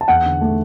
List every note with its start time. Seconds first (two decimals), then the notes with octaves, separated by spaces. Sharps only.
0.01 A5
0.08 E2 F#5
0.26 D3
0.41 A3